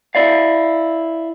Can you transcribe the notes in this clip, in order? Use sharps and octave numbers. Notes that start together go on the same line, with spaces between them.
E4 D5 F5